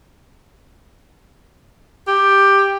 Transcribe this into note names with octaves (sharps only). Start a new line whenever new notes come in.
G4